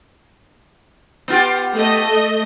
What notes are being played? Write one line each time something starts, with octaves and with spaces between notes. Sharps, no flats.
B3 F4 G4
A3 D#5